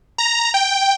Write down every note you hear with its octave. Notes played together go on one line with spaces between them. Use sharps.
A#5
G5